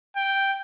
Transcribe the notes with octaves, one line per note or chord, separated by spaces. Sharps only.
G5